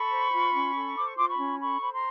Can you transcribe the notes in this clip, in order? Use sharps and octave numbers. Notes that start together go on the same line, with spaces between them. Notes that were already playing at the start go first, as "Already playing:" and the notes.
Already playing: A4 B5 C#6
C5
F4
C#4
A4
C5 D6
C#6
F4 C6 D6
B5 C#6
C#4
A4 B5 C#6
C5 B5
A#5 C6